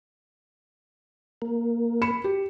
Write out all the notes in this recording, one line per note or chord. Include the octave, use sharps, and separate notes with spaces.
A#3
B5 C#7 E7
G4